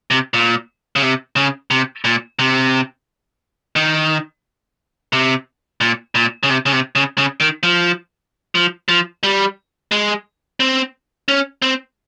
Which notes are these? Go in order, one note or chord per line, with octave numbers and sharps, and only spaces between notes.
C3
A#2
C#3
C3
C#3
C3
A#2
C3
D#3
C3
A#2
A#2
C#3
C3
C#3
C3
C#3
C#3
D#3
F3
F3
F3
G3
G#3
C4
C#4
C4